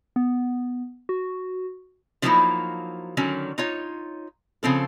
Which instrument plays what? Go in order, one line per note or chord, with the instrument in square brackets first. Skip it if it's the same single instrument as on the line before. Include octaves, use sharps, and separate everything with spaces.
[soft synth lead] B3
F#4
[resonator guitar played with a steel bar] D3 F3 F#3 A#3 D#4 E4
D3 D#3 F#3 C#4
D#4 F4 C#5
C#3 F3 C4 A4